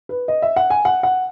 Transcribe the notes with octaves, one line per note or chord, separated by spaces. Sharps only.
B4
D#5
E5
F#5
G#5
F#5
F#5